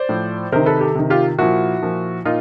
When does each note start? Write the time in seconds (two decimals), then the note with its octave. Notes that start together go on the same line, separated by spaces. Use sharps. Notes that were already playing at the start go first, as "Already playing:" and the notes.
Already playing: C5 D5
0.09 A2 F3
0.52 C3 D#3 A#4 C5
0.66 A4 B4
0.81 G4 A4
0.95 C3 D#3
1.10 F4 G4
1.38 A#2 F3 E4 F#4
1.83 A#2 F3
2.25 A#2 D#4 F4